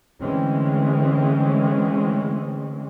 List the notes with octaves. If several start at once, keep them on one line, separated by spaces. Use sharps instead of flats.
D3 E3 G#3 A3 C4 C#4